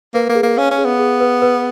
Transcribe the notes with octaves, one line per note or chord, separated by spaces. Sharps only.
A#3 B4
A#3
G#4
A#3
C#4 F5
C#4
G#4
B3
G#4
B4
B4